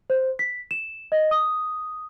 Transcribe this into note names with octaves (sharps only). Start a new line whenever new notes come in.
C5
B6
E7
D#5
D#6